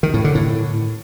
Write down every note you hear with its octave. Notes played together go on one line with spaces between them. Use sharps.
D#3
A2
D3
A2